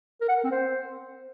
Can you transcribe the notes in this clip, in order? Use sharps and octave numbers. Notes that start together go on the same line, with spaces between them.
A#4
F#5
A#4
C4
C5